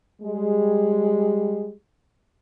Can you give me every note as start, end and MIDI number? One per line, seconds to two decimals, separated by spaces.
0.22 1.72 55
0.22 1.72 56